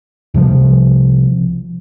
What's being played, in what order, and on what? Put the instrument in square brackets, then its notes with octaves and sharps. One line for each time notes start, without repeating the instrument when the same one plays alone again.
[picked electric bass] C2 C3 F3